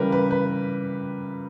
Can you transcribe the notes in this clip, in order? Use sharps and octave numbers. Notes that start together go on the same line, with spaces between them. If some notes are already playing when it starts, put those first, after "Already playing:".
Already playing: C#3 E3 G3 A#4 B4
B4
B4